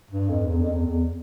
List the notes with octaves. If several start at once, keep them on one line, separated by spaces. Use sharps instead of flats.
G2
F2
E2
F2
E2
E2